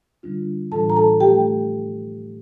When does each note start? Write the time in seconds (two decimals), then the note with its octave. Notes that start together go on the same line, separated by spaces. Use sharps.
0.23 D3 G3 D4 F4
0.72 A2 E3 G3 D4 F4 A4 A5
0.90 A#5
0.96 A4 A5
1.20 F3 A3 G4 G5